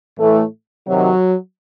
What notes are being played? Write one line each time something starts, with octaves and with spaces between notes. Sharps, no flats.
A2 E3 A3
C3 D#3 F#3